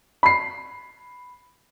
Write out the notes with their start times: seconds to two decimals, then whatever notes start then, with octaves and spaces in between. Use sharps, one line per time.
0.23 B5 C7